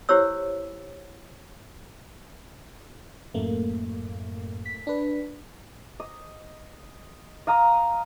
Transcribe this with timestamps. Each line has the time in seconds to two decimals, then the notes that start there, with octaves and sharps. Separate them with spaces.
0.09 E4 G4 C5 C#5 E6
3.34 F#2 A2 A3 A#3
4.65 B6
4.87 D4 B4
6.00 D#5
7.47 D#5 F5 A#5 D#6